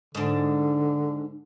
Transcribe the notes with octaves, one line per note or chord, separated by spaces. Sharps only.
G#2 D3 D4